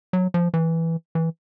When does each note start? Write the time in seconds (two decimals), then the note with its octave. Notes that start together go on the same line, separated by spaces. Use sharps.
0.13 F#3
0.34 F3
0.54 E3
1.15 E3